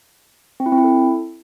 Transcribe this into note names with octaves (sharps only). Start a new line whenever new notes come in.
C4
E4
C4
E4
A4